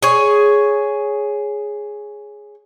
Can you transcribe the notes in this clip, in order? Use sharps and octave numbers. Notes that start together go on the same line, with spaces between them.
G#4 C#5